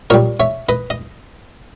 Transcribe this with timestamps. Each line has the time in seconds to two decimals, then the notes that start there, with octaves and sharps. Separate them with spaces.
0.10 A#2 G3 A#4 C#5
0.40 C#5 E5
0.69 B4 D#5
0.90 D#5